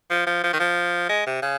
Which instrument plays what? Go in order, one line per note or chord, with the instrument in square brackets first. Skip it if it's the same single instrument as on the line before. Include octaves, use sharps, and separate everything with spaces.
[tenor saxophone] F3
F3
F3
D#3
F3
G#3
C3
C#3